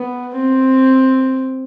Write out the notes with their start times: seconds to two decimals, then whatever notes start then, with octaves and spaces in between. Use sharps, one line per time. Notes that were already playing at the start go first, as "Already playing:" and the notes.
Already playing: B3
0.34 C4